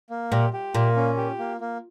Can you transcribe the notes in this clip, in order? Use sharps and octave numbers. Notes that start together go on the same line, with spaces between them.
A#3
A#2 G4
G4
A#2 A#3
C#4
G4
A#3
A#3